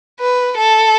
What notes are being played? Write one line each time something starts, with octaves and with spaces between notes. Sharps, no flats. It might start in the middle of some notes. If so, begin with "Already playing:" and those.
B4
A4